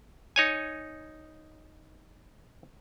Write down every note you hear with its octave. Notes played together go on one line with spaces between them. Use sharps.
D#4 C#5 G#5